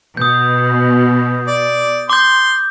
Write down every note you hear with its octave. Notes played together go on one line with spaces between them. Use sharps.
B2 D#6 G6
D5
C6 D6 G6